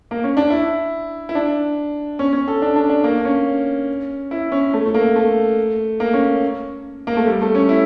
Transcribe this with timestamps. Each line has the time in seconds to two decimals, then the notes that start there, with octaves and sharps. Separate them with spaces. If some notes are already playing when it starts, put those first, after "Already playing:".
0.11 A#3
0.24 C#4
0.37 D4
0.50 E4
1.29 E4
1.35 D4
2.19 C#4
2.33 C#4
2.47 A4
2.62 D4
2.76 D4
2.90 D4
3.04 A#3
3.25 C#4
4.31 E4
4.52 C#4
4.73 A3
4.85 A3
4.94 A#3
5.16 A3
6.00 A#3
6.13 C#4
7.07 A#3
7.17 A3
7.27 G3
7.42 A3
7.55 C#4
7.69 E4